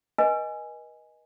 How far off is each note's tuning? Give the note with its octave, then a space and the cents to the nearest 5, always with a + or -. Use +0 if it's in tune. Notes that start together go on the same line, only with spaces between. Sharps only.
B4 -45 D#5 +0 G#5 +0